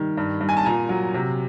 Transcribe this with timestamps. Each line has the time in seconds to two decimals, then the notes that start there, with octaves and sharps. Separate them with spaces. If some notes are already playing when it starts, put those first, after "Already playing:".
Already playing: D#3 G3
0.17 G2
0.40 G2
0.49 G#5
0.57 A5
0.65 A#2 G#5 A#5
0.89 F#3
1.14 C3